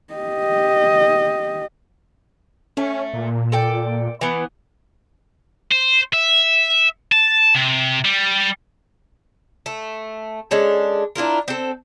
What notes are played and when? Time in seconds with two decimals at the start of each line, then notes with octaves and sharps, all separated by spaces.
0.14 G4 D#5
2.77 A3 C#4
3.13 A#2
3.52 A4 D5 G5
4.21 E3 B3
5.72 C5
6.13 E5
7.12 A5
7.55 C3
8.05 G3
9.66 A3
10.51 G#3 C#4 D4 A4
11.16 D4 E4 F4 A#4
11.48 C4 A4